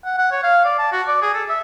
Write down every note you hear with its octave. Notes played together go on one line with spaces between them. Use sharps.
F#5
F#5
C#5
F5
D5
A5
F#4
D5
G#4
A4
E5